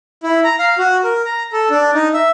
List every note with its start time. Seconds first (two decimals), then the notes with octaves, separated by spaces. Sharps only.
0.23 E4
0.44 A#5
0.59 F5
0.78 F#4
1.04 A#4
1.25 A#5
1.53 A4
1.70 D4
1.94 D#4
2.14 E5